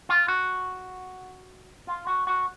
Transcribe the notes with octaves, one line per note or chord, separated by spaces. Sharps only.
F4
F#4
F4
F#4
F#4